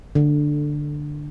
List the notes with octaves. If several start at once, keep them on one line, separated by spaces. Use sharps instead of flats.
D3